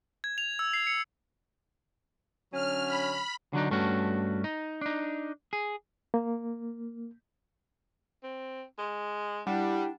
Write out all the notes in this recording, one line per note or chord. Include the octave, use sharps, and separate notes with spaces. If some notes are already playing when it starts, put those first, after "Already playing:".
G#6
F7
E6
C7
C#7
D3 F#3 C#4 F6
B5
D3 F#3 D4 D#4
G2 A3 C#4 F#4
D#4
D4 D#4
G#4
A#3
C4
G#3
G3 D4 E4 F#5